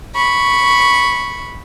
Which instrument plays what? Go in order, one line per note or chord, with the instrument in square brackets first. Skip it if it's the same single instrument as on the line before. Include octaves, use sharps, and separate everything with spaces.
[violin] B5 C#6